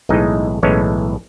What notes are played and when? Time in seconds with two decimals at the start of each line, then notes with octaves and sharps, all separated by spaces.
0.09 B1 A2 E3 G#3 D#4 D#5
0.63 B1 A2 E3 G#3 C#4 C#5